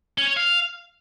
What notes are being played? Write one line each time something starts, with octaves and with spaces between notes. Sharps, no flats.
C#4
C#5
F5